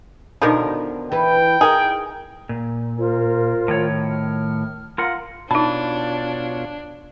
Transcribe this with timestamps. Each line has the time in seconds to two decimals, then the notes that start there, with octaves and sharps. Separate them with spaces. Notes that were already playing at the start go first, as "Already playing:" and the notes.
0.42 B2 D3 D#3 F3 A#4
1.12 E3 B4 G5
1.61 D#4 G#4 A#4
2.49 A#2
2.98 F4 A#4 C5
3.68 A2 D#3 C#5
4.10 F6
4.98 F4 A#4 F5 F#5 C6
5.51 B2 D4 D#4 F4 C#5 A5 B5